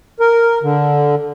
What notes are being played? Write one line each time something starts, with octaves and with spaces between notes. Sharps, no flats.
A#4
D3